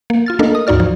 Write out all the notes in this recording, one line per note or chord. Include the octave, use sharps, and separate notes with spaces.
A#3
F4 F6 A6
A3 A#3 D4 A4 A#4 D#5
D#6
D2 G#2 D#4 F#4 D5 F6
F3